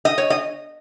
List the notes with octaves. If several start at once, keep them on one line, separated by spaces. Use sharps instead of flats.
D#5
C#5
D#5